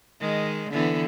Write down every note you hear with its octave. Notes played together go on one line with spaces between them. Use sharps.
D#3 G#3
D3 E3 B3